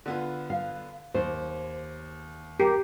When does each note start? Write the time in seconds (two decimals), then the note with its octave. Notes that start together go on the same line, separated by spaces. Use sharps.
0.06 D3 B3 F4
0.50 F5
1.15 D#2 C5
2.60 G4 A#4